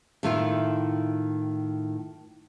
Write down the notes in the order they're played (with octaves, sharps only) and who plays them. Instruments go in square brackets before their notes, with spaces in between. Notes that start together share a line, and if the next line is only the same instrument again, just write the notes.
[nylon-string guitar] A2 D#3 A3 E4 F4